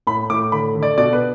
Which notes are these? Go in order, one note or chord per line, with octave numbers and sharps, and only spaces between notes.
A2 B5
A2 D6
D3 B5
D3
D5
B2 D5
B4